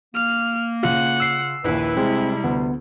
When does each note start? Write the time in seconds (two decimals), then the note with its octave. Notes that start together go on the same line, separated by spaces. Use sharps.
0.15 A#3 F6
0.83 C#3 F4 F#5
1.20 E6 C7
1.64 A#1 D#2 E4 B4
1.97 C3 G3 G#3 C4
2.44 D2 B3